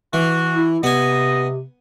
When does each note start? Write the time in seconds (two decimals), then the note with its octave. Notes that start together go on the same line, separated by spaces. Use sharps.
0.13 E3 F#4
0.54 E4
0.83 C3 B3 D#5 G#5